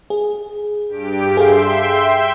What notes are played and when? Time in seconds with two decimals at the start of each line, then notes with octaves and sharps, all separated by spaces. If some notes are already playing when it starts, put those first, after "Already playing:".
0.10 G#4
0.88 G2 G4 D7
1.37 G#4 A4 E5 F5 G5 C6